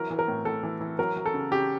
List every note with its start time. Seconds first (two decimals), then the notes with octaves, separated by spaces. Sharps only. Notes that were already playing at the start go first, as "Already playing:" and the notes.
Already playing: E3 F#3 A#4
0.10 E3
0.19 A#4
0.28 A2
0.45 A2 A4
0.63 E3
0.81 E3
0.99 F#3 A#4
1.16 F#3
1.26 A4
1.34 C#3
1.51 C#3 G4